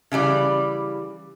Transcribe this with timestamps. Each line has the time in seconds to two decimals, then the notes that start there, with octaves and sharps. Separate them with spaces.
0.12 C#3 E3 G3 D5